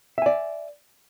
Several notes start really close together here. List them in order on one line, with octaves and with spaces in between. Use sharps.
E5 G#5 D5